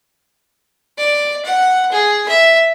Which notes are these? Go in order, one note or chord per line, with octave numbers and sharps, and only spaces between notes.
D5
F#5
G#4
E5